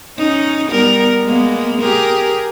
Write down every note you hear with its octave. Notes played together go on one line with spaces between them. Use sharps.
C#4 D#4
G3 B3 A#4
G#3 A#3 B3
G4 G#4 A#4